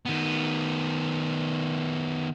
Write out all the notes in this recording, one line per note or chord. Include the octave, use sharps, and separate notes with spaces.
D#3 B3